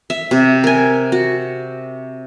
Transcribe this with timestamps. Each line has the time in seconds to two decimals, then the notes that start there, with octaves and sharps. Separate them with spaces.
0.10 E5
0.31 C3
0.64 A#4 G#5
1.12 F#4